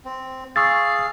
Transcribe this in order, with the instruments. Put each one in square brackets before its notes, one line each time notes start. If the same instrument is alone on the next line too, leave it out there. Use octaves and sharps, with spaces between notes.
[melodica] C4
[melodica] G#4 F5 [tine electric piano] C#6 E6 A6